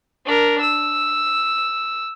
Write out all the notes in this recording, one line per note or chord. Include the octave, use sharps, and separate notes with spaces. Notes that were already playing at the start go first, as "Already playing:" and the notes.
D4 A#4
E6